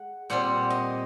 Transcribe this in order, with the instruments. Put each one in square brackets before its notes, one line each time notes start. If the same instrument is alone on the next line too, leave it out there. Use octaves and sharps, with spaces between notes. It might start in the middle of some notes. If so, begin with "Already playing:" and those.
Already playing: [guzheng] G#3 F#5
A#2 G3 C4 F#5
D#5